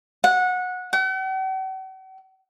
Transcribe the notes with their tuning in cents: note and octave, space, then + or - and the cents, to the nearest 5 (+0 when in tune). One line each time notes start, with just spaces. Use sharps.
F#5 -20
F#5 +45